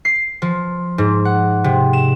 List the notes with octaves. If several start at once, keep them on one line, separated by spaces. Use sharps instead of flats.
C7
F3
G#2
F#5
C3
E7